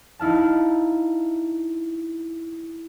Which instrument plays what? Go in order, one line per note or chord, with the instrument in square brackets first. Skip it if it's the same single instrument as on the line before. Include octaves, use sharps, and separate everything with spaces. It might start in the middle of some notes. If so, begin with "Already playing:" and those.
[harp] D#4 E4 F5 A5